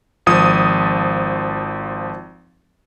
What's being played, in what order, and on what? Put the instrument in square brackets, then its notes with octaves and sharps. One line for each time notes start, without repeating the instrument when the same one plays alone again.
[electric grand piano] G#1 F3 D#6